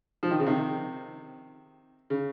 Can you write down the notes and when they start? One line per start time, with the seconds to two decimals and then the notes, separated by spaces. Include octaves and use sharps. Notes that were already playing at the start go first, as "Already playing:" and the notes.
0.23 F3
0.31 D#3
0.40 C#3
0.46 C3 D#3
2.10 C#3